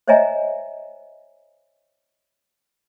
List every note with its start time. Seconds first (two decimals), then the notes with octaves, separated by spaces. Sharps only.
0.08 C5 C#5 D#5 E5 G#5 A#5